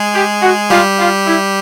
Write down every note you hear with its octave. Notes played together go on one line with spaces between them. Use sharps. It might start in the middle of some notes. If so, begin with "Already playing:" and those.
Already playing: G#3 G#4
G4
F#4
G3 F4 G4
F4
E4